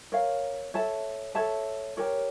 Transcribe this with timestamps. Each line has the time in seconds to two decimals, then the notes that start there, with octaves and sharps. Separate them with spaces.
0.12 A#4 C#5 F5
0.74 A4 C#5 E5 A5
1.35 A4 C#5 E5 A5
1.97 G4 A#4 C#5